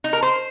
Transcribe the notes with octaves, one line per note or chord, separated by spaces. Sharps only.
D#4
A#4
C5